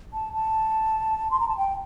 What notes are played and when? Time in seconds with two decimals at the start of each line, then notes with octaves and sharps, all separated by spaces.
0.13 A5
0.34 A5
1.31 C6
1.40 A#5
1.48 A5
1.57 G5